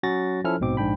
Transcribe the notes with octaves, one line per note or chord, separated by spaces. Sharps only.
F#3 C#4 F#4 A6 A#6
F3 C#4 E4 A4 F6
A#1 G#2 B2 C4 D6
A#1 G#2 D4 G5 B5